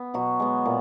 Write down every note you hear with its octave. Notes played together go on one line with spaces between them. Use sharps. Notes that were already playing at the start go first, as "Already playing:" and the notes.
Already playing: B3
B2 F#3 F#4
G#3 B3
A#2